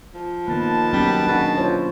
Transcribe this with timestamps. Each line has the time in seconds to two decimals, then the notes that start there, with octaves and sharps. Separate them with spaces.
0.14 F3
0.48 D#3 A#3 B3 B4 A5
0.93 F#3 G3 B3 C#4
1.27 B2 D4 G#4 F#5
1.58 F4 C5 C#5